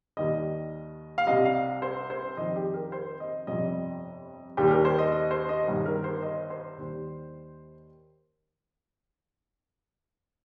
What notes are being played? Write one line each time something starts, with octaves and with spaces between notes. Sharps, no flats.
D#2 D#3 G3 D#5
F5
C2 C3 G3 D#5
F5
C5
C5
F2 D#3 G3 D#5
G4
A#4
C5
D#5
G1 F2 C3 G3 D#5
D#2 D#3 G3 G4
G4
A#4
C5
D#5
D#5
C5
D#5
G1 G2 D#3
A#4
C5
D#5
C5
D#2 D#3 G3